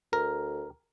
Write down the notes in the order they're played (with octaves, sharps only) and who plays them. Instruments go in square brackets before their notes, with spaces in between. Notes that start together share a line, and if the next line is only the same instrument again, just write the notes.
[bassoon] D2 [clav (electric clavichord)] A#4